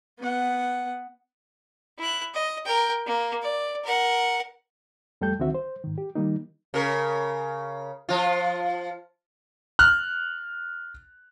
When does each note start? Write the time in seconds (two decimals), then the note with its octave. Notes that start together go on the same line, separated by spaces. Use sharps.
0.19 B3 F#5
1.99 E4 F#6
2.34 D#5
2.65 A#4 G5
3.06 A#3
3.42 D5
3.84 A#4 F#5
5.21 F2 G3 A3 A4 G5 G6
5.39 C#2 D3 D#3 C4 F#4 E5
5.55 C5
5.84 G#2 D#3
5.98 G4
6.15 D#3 G3 A#3 D#4
6.74 C#3 A#4
8.09 F3 F4
9.79 F6 F#6